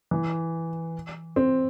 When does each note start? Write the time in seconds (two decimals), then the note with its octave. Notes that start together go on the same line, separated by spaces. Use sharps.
0.11 E3
1.36 C4